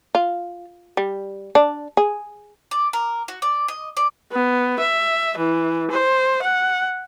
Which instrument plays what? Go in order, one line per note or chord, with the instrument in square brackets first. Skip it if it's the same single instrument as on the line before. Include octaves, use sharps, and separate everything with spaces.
[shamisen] F4
G3
D4
G#4
[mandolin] D5
A#4
F#4
D5
D#5
D5
[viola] B3
E5
E3
C5
F#5